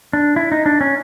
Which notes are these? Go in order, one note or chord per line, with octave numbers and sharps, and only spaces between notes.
D4
E4
D#4
D4
C#4